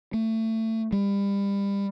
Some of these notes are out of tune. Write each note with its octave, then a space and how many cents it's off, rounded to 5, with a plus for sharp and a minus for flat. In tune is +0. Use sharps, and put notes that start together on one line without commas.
A3 +25
G3 +30